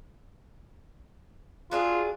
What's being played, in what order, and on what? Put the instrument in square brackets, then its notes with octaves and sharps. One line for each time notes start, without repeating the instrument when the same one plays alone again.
[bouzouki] F#3 D4 G#4 [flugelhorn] F4